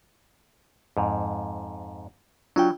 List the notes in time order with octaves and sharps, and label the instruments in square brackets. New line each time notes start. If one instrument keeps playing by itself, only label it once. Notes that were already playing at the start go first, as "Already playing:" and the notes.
[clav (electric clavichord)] F2 G#2
[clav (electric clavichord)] F#3 [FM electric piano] D4 F4 G5